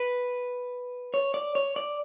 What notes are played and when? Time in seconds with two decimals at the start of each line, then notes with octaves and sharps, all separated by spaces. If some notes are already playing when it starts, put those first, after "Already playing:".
Already playing: B4
1.14 C#5
1.34 D5
1.55 C#5
1.76 D5